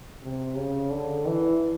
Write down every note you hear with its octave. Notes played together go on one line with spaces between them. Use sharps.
C3
C#3
D3
E3